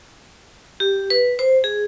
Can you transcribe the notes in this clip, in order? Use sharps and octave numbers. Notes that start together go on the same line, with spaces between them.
G4
B4
C5
G#4